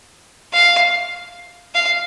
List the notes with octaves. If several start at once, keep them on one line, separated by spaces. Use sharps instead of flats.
F5
F5